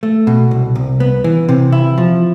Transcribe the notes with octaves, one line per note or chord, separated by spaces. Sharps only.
A3
B2
C2
C2
B3
E3
C3
E4
F3